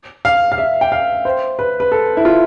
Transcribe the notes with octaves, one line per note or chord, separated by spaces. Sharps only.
F5
F5
E5
G5
F5
C5
B4
B4
A4
E4
F4